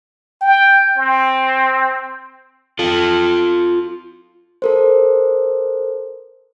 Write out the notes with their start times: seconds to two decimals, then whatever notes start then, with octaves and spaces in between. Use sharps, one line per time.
0.41 G5
0.97 C4
2.79 F4 A4
4.62 A4 A#4 C5